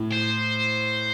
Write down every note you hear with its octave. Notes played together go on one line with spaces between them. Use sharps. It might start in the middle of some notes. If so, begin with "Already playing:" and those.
Already playing: A2
C5